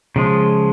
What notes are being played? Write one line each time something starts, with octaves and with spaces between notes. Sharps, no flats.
C#3 F3 G#3